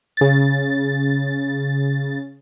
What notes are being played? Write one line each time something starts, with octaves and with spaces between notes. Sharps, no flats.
C#3 A6